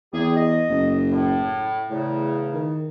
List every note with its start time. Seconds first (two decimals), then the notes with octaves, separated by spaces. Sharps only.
0.13 E2 G3 G#4
0.35 D#5
0.69 F#1
1.10 A2
1.90 E2 A2 C#3
2.53 D#3